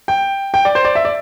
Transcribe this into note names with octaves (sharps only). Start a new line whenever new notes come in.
G5
G5
D5
C5
D5
E5
D5